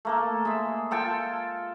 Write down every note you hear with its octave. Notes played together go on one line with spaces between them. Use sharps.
A3 A#3 A4
G#3 E5
F4 A4 G5 G#5